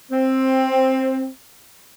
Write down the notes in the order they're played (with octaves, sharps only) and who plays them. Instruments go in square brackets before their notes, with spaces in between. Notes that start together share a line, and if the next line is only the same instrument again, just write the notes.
[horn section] C4